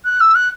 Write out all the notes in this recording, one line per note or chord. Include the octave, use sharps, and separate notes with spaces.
F#6
E6
F#6